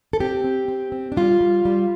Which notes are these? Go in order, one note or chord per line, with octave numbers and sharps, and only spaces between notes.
A4
C4 G4
C4
C4
C4
D4
G3 F4
G3
G3